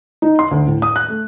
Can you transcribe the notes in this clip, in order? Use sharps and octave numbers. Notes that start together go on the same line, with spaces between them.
D#4
C6
D2
A2
D#6
F#6
A3